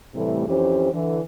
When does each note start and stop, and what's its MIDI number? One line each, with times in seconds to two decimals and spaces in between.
0.14 0.45 45
0.14 0.45 48
0.14 0.45 52
0.14 0.45 55
0.14 0.45 57
0.47 0.89 41
0.47 0.89 52
0.47 0.89 61
0.47 0.89 67
0.47 0.89 72
0.93 1.20 50
0.93 1.20 52